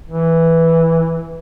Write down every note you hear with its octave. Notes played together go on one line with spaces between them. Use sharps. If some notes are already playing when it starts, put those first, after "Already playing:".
E3